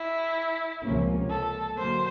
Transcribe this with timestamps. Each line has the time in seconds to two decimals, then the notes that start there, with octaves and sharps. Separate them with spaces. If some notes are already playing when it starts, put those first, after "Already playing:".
Already playing: E4
0.82 C#2 C3 F3 A#3 C#4
1.30 A4
1.77 D3 F#3 A#3 C5